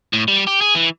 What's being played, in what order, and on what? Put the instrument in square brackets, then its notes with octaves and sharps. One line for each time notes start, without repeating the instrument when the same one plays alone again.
[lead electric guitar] A2
G3
G4
G#4
E3